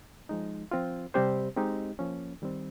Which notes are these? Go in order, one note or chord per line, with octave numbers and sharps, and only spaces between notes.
F3 G#3 D#4
F3 C4 F4
C3 G3 C4 G4 C5
G#3 C4 D#4 G4
F3 A#3 C#4
D#3 G3 C4